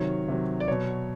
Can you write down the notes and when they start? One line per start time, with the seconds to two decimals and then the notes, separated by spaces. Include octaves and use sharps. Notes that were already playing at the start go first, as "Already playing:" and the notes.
Already playing: C3 D#3 F#3 C#5
0.28 C3 D#3 F#3
0.60 D5
0.68 B2 F#3 C#5